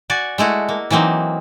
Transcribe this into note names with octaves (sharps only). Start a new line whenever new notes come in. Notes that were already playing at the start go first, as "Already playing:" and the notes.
F#4 D5 G#5
G#3 A3 E4 F#4
A#3
E3 F#3 A#3 C4 D#4